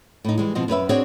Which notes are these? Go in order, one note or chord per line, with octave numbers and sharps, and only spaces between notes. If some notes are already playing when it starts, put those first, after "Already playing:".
A2 D#4
E3 G3 G#3
B2 F3 C4 D#5
F#2 C#4 B4 E5
C4 D4 F#4 G#4 C5 C#5